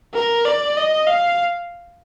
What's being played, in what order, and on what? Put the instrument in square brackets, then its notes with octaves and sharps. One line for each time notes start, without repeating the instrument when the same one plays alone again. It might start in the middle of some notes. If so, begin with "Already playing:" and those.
[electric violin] A#4
D5
D#5
F5